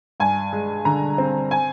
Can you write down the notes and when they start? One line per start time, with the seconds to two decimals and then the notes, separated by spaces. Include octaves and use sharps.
0.20 G2 G#5
0.53 G#3
0.85 D3 A#5
1.18 C4
1.51 G#5